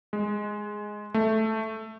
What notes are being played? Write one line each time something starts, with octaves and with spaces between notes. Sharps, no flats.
G#3
A3